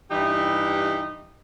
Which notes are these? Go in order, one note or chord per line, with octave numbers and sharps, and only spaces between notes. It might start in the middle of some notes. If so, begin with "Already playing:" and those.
G2 E3 G3 D#4 E4 G4